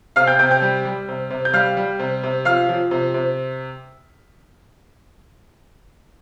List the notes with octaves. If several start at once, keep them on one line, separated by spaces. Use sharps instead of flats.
C3 F5 F6
G5 G6
C3 G5 G6
G5 G6
G3
G3
C3
C3
G6
G3 F5 F6
G3
C3
C3
F3 F5 F6
F3
C3
C3